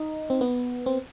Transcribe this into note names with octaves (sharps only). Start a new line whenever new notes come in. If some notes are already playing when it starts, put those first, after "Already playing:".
Already playing: D#4
C4
B3
C4